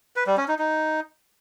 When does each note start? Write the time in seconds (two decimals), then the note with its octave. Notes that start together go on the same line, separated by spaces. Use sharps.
0.16 B4
0.27 G3
0.37 C#4
0.48 D#4
0.59 D#4